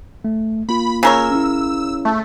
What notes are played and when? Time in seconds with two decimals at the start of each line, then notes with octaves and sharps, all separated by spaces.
0.25 A3
0.69 A#3 F4 B5
1.03 C#3 A#4 C#5 E6
1.31 C#4 E4
2.05 A3